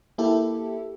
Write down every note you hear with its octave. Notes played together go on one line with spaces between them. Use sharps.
A#3 E4 G4 A4